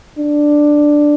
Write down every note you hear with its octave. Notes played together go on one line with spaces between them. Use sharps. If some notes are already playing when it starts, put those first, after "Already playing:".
D4